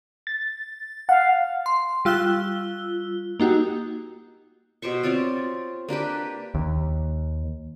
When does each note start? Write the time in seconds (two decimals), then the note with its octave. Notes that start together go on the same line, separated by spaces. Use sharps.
0.27 A6
1.09 F5 F#5
1.66 C6
2.05 G3 F4 E6 F#6 G7
3.40 A#3 D#4 F#4 G4
4.82 B2 G4 C5 C#6
5.03 C4 F4 C#5 D5
5.89 A#3 D4 G4 B4
6.55 D#2